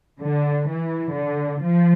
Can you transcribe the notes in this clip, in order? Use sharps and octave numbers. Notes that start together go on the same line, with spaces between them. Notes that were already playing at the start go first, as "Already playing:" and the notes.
D3
E3
D3
F3